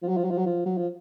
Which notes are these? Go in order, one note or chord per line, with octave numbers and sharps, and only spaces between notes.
F3
F#3
F3
F#3
F3
F#3
F3
F#3
F3